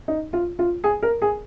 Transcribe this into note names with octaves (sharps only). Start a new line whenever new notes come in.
D#4
F4
F4
G#4
A#4
G#4